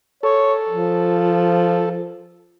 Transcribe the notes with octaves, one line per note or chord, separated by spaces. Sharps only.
A4 C#5
F3